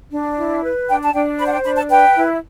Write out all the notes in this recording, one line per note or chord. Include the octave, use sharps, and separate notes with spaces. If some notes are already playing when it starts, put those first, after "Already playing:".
D4
E4
B4
D4 G5
A5
D4 G5
C5 B5
F#5
G5
D4 B5
A5
B4 G5
E4